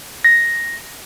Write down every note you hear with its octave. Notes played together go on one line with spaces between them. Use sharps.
A#6